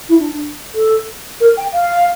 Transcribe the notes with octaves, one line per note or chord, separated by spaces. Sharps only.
E4
D4
D4
A4
A#4
G5
F5